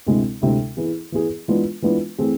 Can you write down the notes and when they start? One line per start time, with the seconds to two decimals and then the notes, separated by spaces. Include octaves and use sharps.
0.06 D2 C3 G#3 C4 E4
0.42 D2 C3 G#3 C4 E4
0.77 E3 B3 E4 G#4
1.12 E3 B3 E4 G#4
1.48 E3 G#3 B3 D4 F4
1.82 E3 G#3 B3 D4 F4
2.18 E3 A3 C4 G#4